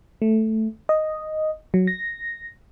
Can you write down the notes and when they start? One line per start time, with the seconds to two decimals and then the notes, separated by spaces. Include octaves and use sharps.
0.22 A3
0.89 D#5
1.74 F#3
1.87 A#6